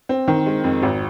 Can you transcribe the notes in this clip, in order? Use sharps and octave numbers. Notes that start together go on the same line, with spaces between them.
C4
D#3
G#3
F2
G#1